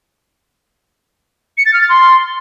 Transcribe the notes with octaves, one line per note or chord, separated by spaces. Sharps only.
C#7
A6
F6
A6
C6